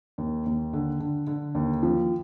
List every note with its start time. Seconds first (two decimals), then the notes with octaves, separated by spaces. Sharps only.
0.18 D#2
0.46 D#2
0.73 D3
1.00 D3
1.27 D3
1.55 D#2
1.83 F3